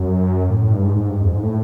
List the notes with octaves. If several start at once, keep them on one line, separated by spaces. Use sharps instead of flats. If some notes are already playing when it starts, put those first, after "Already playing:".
Already playing: F#2
A2
A2
G2
G#2
G#2
G2
F2
G#2
A2